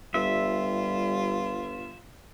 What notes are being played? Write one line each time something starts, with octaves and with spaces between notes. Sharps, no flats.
G1 G3 F4 E5